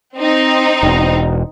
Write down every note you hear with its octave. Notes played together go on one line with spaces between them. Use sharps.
C4 D#4
E1